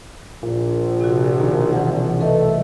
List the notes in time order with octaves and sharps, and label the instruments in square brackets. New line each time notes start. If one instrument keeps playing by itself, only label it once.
[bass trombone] A#1 [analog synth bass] A#2
[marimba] C3 F#4
[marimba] B2 [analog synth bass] D#3
[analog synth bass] C2 [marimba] E3 F#5
[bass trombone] A3 [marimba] A4 B4 D#5